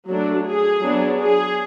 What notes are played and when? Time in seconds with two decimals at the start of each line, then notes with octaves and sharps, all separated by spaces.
0.09 F#3 A3 D4
0.46 G#4
0.84 F#3 B3 D4
1.21 G#4